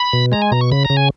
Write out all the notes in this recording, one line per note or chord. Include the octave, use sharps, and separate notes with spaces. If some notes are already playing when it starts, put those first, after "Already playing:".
Already playing: B5
B2
G#3 A#5
G#5
B2 A#5
C#6
C#3 B5
A#5
C#3
G#5